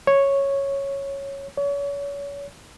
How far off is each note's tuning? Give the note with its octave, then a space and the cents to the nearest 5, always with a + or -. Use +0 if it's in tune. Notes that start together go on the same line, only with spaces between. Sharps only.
C#5 -5
C#5 +35